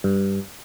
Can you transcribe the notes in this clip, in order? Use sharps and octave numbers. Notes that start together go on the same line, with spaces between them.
G2